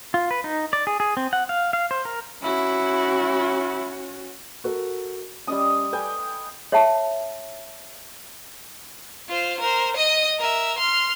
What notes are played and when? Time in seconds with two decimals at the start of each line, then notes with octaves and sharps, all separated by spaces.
0.14 F4
0.31 B4
0.44 D#4
0.73 D5
0.87 G#4
1.00 G#4
1.17 C4
1.33 F#5
1.49 F5
1.73 F5
1.91 C5
2.05 A#4
2.42 C#4 E4 F#4
4.64 F#4 A4 A#4
5.47 G3 C#4 D#5 D#6
5.93 A4 B4 G5 G#5
6.72 C#5 E5 F#5 A5
9.29 F4 C5
9.60 A#4 C5
9.96 D#5 D#6
10.39 A#4 E5
10.78 C6 F6